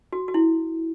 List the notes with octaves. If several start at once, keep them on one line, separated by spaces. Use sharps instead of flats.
F#4
F#4
E4